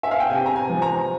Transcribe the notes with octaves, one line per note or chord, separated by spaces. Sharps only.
E5
F5
G5
C3 G#5
A#5
G#5
F3
A#5